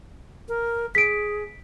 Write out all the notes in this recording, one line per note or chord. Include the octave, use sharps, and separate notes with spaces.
A#4
G#4 B6 D7